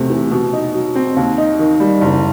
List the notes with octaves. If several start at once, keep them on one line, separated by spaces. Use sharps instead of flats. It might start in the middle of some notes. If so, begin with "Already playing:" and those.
Already playing: E2 C3 A3
E3
B2
D#4
F#3
C4
D#2
D#4
D#3
G3
F#1